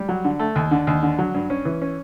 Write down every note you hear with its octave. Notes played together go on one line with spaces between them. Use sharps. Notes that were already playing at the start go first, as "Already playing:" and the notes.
Already playing: G3
F#3
D3
A3
D#2
D3
D#2
D3
F#3
G2
C#4
E3
C#4